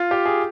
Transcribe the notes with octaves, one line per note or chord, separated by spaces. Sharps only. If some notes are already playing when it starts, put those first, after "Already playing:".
Already playing: F4
G4
G#4